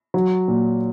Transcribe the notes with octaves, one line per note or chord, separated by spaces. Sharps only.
F#3
A#2